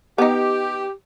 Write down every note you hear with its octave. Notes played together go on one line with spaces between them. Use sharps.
B3 D#4 G4